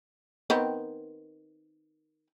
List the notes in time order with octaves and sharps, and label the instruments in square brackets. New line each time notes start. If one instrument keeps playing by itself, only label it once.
[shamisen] D#3 B3 C4